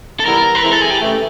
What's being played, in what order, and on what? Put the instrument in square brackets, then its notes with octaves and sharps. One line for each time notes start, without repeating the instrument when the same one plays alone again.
[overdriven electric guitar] A4
[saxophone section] E3 G3 B3 E4 [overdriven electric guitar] A#4
[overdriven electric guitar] B4
[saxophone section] E3 G#3 C4 E4 [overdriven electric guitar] A#4
[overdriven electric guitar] A4
G#4
G4
[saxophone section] C#3 E3 A3